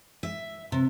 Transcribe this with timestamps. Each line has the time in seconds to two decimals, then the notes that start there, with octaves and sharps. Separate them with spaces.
0.23 E5
0.72 C3